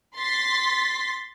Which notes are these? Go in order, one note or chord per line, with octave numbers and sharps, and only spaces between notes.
C6 A6 B6